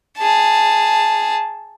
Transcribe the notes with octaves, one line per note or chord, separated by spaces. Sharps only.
G#4 A5